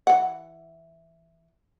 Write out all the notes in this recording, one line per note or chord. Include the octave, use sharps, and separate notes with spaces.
E3 F#5